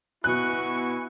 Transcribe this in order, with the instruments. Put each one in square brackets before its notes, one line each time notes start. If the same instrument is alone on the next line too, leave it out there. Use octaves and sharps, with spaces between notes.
[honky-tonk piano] B2 F#6 [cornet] E4 [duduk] F#4 [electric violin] G#5 C#6